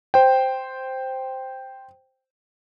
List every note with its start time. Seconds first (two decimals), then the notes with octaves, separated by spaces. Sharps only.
0.14 C5 G5